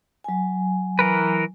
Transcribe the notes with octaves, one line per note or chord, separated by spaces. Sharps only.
F#3 G#5
E3 A#4 B4